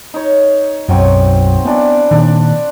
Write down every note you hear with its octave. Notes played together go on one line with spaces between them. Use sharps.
D#4 C#5
B1 F#2 F#3 C4 C#6
E3 B3 D4 D5
A#2 D#3 D4